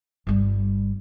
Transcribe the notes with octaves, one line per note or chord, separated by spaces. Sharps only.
G1 G3